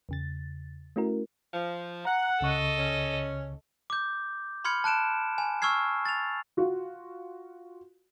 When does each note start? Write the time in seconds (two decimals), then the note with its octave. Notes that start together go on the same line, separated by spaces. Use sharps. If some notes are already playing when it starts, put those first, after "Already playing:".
0.09 E2 C#3 A6
0.96 A3 C#4 E4 F#4 A#4
1.54 F3
2.05 F#5 A#5
2.41 C#2 C#3 A4 D#5 C#6
2.78 C#4
3.90 D6 G6
4.64 B5 C6 F6 G#6 C#7
4.84 A5 F#6 D7 E7
5.38 G#5
5.62 C#6 E6 F6 G#6 C7
6.05 A6 F7
6.57 F4 F#4